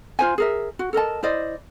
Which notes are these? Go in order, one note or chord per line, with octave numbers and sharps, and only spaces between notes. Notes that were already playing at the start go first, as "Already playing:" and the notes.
F4 C5 G#5
G#4 A#4 E5
F#4
A4 A#4 D#5 A5
E4 C5 D5 D#5